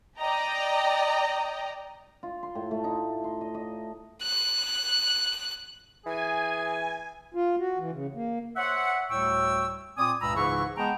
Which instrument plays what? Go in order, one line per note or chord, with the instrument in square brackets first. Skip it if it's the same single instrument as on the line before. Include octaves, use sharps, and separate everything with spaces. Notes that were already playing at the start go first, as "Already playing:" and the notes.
[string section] D5 D#5 G5 A#5
[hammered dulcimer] F4
C6
A2
A3
D#4
C6
D#5
D#5
[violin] F#6
[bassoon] E3 [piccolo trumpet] G#4 [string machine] G#5
[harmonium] F4
F#4
E3
C#3
A#3
[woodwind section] C5 C#5 E5 F#5
D2 A2 G3 G5 C#6 E6
A#2 C4 D5 G#5 D#6
C#2 G2 A#2 A#5 B5 E6
C#2 G#2 C#3 E3 E4 C#6
G#3 B3 G#4 G5 A5 A#5